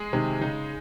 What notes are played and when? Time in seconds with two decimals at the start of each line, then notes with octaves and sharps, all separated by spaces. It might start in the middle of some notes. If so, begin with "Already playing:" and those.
Already playing: G#3 G#4
0.13 C3 D#3 G#3
0.41 C#3 D#4